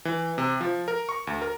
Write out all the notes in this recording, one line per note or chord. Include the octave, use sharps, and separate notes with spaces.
E3
C3
F3
A#4
C#6
D2
A#4